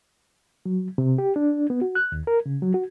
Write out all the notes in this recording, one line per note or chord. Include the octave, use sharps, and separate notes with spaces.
F#3
C3
G4
D4
B3
F#4
F#6
D#2
A#4
C#3
F#3
F#4